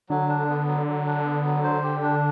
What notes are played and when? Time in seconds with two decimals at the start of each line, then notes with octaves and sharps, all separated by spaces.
0.09 D3 F#3
0.28 D4
0.48 B3
0.67 F#3
0.87 F#3
1.06 D4
1.25 B3
1.45 F#3
1.64 C5
1.83 G4
2.03 D4